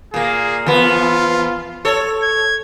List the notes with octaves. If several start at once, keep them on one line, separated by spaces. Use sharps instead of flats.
A#2 A#3 G#4
E2 F3 B3 F4
A4 C#5
G#6